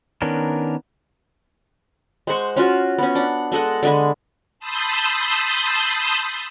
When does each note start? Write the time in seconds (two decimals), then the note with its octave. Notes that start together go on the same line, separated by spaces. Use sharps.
0.22 D#3 B3 C#4 D4 A#4
2.27 G#3 C5 F#5 C#6
2.56 C#4 F4 F#4
2.98 B3 C#4
3.15 D4 F#5
3.52 G#3 A4 D#5 F#5
3.83 D3 G#3 B5
4.59 A5 B5 C6 D#6 E6 G6